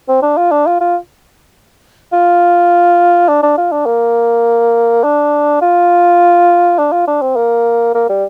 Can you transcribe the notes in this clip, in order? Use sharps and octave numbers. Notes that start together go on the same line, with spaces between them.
C4
D4
F4
D4
F4
F4
F4
D4
D4
F4
D4
A#3
D4
F4
D4
F4
D4
C4
A#3
A#3
G3